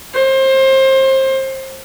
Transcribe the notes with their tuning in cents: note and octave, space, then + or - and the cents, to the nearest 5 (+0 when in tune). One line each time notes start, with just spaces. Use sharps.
C5 +25